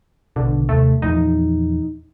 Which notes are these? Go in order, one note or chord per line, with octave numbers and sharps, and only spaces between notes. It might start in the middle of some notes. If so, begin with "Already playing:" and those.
A#1 B2 D3
D#2 C3 A3
E2 A#2 F3 D#4